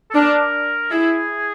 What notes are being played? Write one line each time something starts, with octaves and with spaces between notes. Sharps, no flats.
A4
D4 A#4
E4 G#4